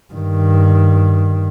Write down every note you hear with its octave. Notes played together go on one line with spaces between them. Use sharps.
G2 D#3